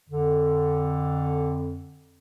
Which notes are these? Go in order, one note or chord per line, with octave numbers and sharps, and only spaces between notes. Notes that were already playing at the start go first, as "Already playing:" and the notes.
F2 D3